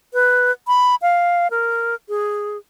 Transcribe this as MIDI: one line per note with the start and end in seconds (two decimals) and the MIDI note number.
0.13 0.52 71
0.67 0.95 83
1.02 1.50 77
1.50 1.95 70
2.09 2.57 68